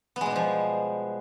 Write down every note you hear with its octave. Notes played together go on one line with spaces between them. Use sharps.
B2 F3 G3 G#3 B3